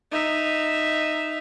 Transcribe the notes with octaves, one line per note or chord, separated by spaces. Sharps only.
D#4 E5